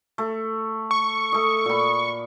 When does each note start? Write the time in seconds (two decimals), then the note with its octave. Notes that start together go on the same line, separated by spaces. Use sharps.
0.18 A3
0.91 C#6
1.32 A3 D#5
1.65 A#2 B5